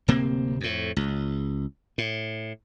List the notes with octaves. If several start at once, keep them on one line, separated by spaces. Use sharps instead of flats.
D1 C3 A#3 C4
F2 A2
C#2
A2